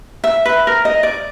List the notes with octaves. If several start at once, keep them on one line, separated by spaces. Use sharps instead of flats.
E5
B4
A#4
D#5
D5